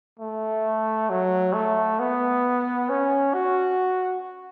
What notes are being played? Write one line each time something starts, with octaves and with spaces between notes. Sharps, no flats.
A3
F#3
A3
B3
C#4
F#4